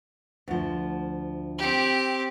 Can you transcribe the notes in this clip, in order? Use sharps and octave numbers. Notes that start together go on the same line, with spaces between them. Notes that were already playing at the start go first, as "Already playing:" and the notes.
D2 F3
C4 G4